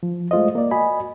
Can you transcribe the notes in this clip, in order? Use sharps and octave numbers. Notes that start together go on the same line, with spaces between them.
F3
G#3 A3 F4 C5 D#5
A#3 D5
F#4 D#5 G#5 B5